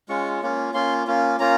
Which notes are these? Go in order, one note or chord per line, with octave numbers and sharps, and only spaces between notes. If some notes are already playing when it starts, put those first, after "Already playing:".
G#3 C#4 F4 C#6
A#3 C#4 F4
A#3 C#4 F4 C6
A#3 C#4 F4
A#3 C#4 F4 A#5